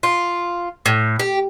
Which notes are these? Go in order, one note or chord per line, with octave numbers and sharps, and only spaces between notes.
F4
A2
G4